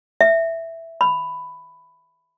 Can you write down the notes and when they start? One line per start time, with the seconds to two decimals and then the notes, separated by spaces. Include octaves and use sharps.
0.21 E5
1.01 B5